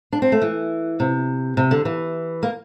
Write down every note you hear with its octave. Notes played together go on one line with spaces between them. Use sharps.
D4
C4
A3
E3
C3
C3
D3
E3
A#3